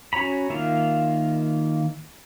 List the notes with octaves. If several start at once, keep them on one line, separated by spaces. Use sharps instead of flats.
C#4 F#4 C#5 A#5 B5
D#3 A#3 F4 E5 F5